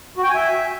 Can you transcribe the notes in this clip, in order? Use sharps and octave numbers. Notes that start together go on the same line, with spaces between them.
F#4
G5
G#5
E5